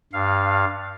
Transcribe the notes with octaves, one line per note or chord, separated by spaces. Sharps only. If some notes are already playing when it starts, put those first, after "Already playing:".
G2 F5